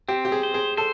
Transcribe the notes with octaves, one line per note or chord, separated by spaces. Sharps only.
C4 G4
G4
G#4
C5
G#4
A4 C5